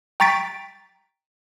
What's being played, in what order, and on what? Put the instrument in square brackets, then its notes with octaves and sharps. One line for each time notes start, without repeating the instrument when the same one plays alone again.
[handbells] G5 A#5 C#6 A6 B6 D7